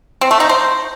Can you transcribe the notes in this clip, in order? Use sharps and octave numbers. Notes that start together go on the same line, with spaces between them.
C4
A3
D#4
C5